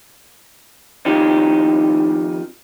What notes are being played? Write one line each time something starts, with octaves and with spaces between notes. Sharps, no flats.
F2 D#3 F3 D#4 G4